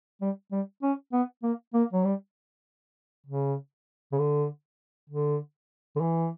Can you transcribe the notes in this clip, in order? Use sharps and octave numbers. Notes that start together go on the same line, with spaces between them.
G3
G3
C#4
B3
A#3
A#3
F#3
G3
C#3
C#3
D3
D3
D3
E3